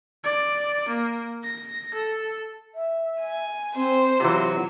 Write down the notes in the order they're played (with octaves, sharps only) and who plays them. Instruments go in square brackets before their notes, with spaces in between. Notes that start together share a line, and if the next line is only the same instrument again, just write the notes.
[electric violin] D5
A#3
A#6
A4
[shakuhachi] E5
[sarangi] G#5
[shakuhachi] C4 [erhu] C5
[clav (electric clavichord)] C3 E3 [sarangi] F#3 [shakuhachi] F4